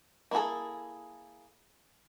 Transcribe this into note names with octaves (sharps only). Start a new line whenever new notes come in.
A#3 E4 F4 G#4 A4